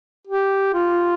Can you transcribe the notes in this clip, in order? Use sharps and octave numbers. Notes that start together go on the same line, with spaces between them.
G4
F4